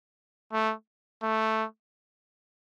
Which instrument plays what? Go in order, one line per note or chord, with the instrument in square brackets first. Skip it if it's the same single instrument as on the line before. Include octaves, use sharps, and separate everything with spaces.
[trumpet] A3
A3